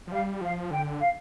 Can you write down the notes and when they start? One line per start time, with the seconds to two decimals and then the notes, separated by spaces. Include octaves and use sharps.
0.07 F3
0.11 G3 F5
0.41 F3 F5
0.71 D3 G5
1.00 F5